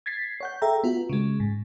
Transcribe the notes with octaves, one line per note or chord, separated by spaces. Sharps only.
G#6 A6 B6 C7
C#5 F#5 G6
G#4 A4 E5 G5 A#5
B3 F4 F#4
C#3 G#3
G#2